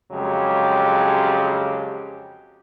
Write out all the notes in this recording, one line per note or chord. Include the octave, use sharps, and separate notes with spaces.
F2 C#3 F#3 G#3 G4